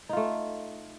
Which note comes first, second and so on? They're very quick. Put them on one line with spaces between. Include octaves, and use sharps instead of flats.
D#4 F4 A3